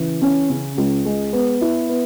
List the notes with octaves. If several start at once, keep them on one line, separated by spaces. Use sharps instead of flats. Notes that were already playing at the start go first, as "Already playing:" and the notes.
Already playing: C#3 E3
C#4
C#3
C#2
G#3
B3
E4
B3